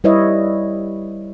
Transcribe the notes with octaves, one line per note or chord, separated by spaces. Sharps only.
G3 E4 B4 C#5 D#5 E5